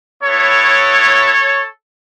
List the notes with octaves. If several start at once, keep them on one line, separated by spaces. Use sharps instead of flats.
B3 E4 A4 C#5